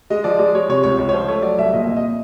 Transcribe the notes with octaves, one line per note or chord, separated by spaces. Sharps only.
G#3 D#5
F3 D5
G#3 D5
G#3 C#5
C3 C#5
C#2 C#5
C#2 C#5
C#5
F3 C5
A3 C#5
F#3 D5
C2 E5
A#2 D#5
F2 E5
D#5